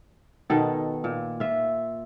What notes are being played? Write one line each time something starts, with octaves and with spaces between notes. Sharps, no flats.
B2 D#3 A4
A#2
F4 E5